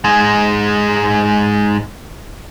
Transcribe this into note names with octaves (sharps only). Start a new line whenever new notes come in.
G#2 G#3